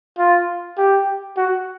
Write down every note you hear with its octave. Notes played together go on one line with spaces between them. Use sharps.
F4
G4
F#4